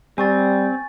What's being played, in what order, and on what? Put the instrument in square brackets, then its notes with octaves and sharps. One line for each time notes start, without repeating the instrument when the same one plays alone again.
[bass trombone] G3 [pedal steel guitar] C4 [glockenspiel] G#5 C#6 A6